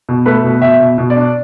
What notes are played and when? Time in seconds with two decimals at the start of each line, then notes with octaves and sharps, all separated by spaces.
0.09 B2
0.26 A3 B4
0.44 B2
0.62 B2 E5
0.80 B2
0.98 B2
1.10 D5
1.16 D4